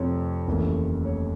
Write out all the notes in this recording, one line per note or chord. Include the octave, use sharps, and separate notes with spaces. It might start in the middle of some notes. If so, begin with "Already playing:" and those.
Already playing: F2 C3 F3 A3 C4 C#5
F1 D#2 C#3 E3 A3
C#5